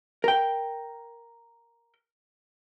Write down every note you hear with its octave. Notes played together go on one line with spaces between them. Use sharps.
A#4 G5